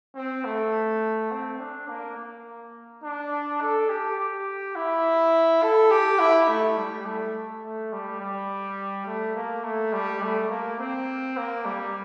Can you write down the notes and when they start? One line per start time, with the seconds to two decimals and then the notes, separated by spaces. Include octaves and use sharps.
0.16 C4
0.44 A3
1.31 C4
1.60 D4
1.88 A#3
2.18 A#3
3.04 D4
3.61 A4
3.89 G4
4.18 G4
4.76 E4
5.62 A4
5.91 G4
6.19 E4
6.48 A3
6.77 G3
7.06 A3
7.63 A3
7.92 G3
8.20 G3
9.07 A3
9.35 A#3
9.64 A3
9.93 G3
10.22 A3
10.50 A#3
10.79 C4
11.37 A#3
11.65 G3